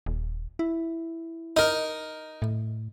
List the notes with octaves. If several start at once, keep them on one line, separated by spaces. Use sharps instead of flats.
D#1
E4
D#4 A#4
A2